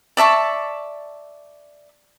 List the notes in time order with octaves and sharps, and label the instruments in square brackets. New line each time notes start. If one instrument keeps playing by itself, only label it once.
[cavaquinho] D5 E5 A5 C#6